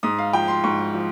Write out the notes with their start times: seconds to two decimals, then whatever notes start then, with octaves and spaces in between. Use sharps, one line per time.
0.03 G#2 D#6
0.18 F5
0.33 F3 G5
0.48 C6
0.64 G#2 C#6
0.94 F3